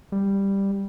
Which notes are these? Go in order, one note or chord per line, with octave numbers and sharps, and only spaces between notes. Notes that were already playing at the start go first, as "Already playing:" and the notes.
G3